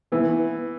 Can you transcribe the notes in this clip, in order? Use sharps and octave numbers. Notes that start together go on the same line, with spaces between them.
E3 B3